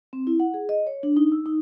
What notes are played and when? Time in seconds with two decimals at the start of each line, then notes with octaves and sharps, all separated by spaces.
0.13 C4
0.27 E4
0.40 F#5
0.54 G#4
0.69 D#5
0.87 C#5
1.03 D4
1.17 D#4
1.32 E6
1.46 D#4